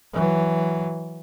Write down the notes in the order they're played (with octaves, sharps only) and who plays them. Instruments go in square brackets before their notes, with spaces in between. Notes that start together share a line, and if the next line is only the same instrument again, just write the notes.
[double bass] E3 F#3